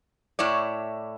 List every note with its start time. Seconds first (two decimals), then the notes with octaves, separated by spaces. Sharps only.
0.39 A2 E4 C#5 D5